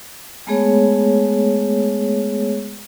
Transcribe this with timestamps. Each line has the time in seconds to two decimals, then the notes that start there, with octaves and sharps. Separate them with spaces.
0.47 G#3 A3 B3 G#4 C#5